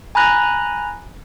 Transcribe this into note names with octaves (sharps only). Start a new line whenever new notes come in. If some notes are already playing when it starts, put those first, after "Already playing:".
G#5 A#5 B5 F#6 A#6